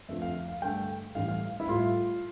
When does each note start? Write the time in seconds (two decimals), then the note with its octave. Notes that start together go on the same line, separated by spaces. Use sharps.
0.09 F2 D3 F3 A3 E5
0.22 F5
0.48 F5
0.62 G2 D3 A3 G5
1.15 A2 E3 G3 F5
1.28 F5
1.60 E4
1.68 A2 G3 F4